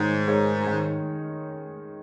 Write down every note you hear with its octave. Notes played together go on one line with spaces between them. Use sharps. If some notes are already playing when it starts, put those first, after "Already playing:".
Already playing: G#2 D#3 D#4 C#5
G#3 D#4 A#4 C#5
D#3